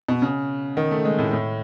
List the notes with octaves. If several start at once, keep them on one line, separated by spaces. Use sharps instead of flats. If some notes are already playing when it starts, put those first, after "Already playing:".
B2
C#3
D#3
A3
G#3
A2
A2